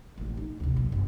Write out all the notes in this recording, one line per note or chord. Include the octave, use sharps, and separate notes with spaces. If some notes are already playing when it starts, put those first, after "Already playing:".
A1 B3
D#4
D2 C3
A#1 F#3
F#1